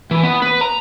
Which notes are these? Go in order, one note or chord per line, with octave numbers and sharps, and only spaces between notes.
E3
B3
B4
A#5